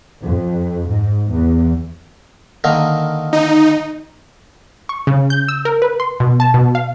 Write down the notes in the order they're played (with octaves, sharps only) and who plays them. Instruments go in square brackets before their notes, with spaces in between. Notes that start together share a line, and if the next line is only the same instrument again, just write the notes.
[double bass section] F2
G#2
E2
[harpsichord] D3 D#3 A#3
[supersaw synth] D#4
[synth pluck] C#6
C#3
G6
E6
A#4
B4
C6
B2
A5
B2
F5